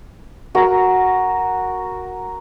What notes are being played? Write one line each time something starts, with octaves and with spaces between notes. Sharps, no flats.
F#4 A#4